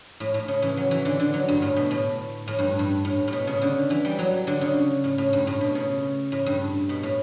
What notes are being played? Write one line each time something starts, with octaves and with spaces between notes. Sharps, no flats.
A2
A2
C#3
E3
F#3
E3
D3
D3
F#3
G2
A2
B2
A2
A2
G2
G2
A2
A2
B2
C#3
D3
E3
G3
F#3
D3
C#3
A2
A2
G2
A2
B2
C#3
A2
G2
B2
A2